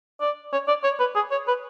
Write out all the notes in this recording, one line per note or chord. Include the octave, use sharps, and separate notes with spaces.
D5
C#5
D5
C#5
B4
G#4
C#5
B4